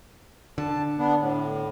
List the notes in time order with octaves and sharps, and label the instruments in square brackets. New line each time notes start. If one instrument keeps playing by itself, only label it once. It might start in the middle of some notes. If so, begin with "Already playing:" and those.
[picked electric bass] D3 [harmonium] A5
[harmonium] B3 D4
A2